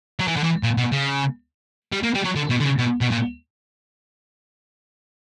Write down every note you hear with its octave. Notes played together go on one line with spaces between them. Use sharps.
F#3
E3
D3
E3
A#2
B2
C#3
G3
A#3
G3
F#3
D3
B2
D3
C#3
B2
B2
A#2